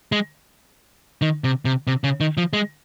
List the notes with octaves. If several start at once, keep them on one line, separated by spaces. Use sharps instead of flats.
G#3
D#3
C3
C3
C3
C#3
D#3
F3
G#3